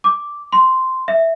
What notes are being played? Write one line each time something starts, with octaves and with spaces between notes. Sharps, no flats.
D6
C6
E5